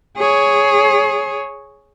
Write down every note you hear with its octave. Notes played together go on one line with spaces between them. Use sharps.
G#4 C#5